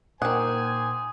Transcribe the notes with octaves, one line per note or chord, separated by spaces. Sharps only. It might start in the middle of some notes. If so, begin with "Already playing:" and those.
A#2 D#3 C5 F#5 G#5 D6 D#6